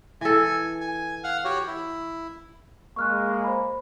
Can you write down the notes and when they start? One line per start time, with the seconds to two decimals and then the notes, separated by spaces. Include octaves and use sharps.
0.21 E3 A4 G#5
0.81 G#5
1.24 F5 F#5
1.45 F#4 G4 C#5
1.67 E4
2.96 G#3 A#3 C#6 F6 F#6
3.44 C5 B5